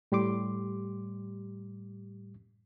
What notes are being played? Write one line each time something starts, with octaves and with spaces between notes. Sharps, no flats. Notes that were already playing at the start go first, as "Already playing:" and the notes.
A2 G3 G4 C6 D6